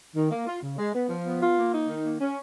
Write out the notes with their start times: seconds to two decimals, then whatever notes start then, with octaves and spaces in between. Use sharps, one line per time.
0.16 D#3
0.31 A#3
0.47 F4
0.62 C#3
0.78 G#3
0.94 B3
1.09 F3
1.25 B3
1.41 F4
1.57 A#3
1.73 D#4
1.88 D#3
2.04 A#3
2.21 C#4